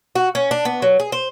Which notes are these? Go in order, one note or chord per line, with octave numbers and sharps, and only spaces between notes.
F#4
C#4
D4
B3
F#3
G#4
C5